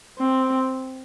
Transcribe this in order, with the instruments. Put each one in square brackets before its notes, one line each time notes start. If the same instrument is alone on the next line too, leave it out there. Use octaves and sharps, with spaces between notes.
[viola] C4